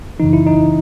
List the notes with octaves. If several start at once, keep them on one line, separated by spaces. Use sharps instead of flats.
F#2 C#3 E3 D#4
E4
D#4